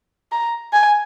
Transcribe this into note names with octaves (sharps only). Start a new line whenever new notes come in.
A#5
G#5